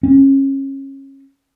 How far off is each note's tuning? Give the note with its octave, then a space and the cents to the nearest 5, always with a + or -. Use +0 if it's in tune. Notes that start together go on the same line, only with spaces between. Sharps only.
C#4 -25